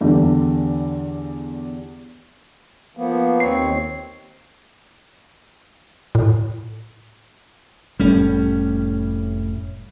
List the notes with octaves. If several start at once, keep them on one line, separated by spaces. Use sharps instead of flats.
E2 D3 G3
F3 A#3 B3
D#2 C4 C#5 C7
A2
F1 A2 G3 C#4